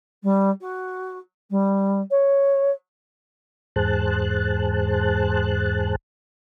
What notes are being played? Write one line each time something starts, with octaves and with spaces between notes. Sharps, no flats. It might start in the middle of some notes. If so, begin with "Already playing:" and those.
G3
F#4
G3
C#5
E2 G#2 G#4 C5 A5 F#6